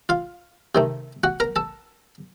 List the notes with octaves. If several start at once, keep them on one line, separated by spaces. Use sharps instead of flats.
F4 F5
C3 D#3 A3
F#4 F#5
A#4 A#5
A4 A5